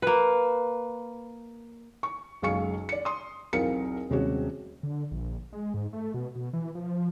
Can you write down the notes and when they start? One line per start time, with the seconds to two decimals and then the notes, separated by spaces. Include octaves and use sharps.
0.02 A#3 B4
2.03 C#6
2.42 F#1 B1 G#3 F5 C#6 C#7
2.89 D5 C#7
3.05 C6 D#6
3.53 B1 E2 C4 A#4 F5 C#7
4.10 D#1 C3 G#3 C#4 F#4
4.83 D3
5.11 A#1
5.53 G#3
5.74 G#2
5.93 A3
6.14 B2
6.36 B2
6.53 E3
6.75 F3